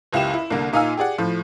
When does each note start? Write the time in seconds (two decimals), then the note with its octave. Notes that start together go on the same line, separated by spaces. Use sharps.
0.13 F#1 C#2 E4 G4 E7
0.33 E4
0.50 C2 D3 A#3
0.73 A#2 D#4 F4 F5 G#5 E6
0.97 G4 G#4 D5 F#5
1.18 A2 F3 A3